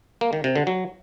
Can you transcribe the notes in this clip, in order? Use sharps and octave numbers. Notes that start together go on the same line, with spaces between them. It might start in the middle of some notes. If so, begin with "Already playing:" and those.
A#3
D#3
C3
D3
F#3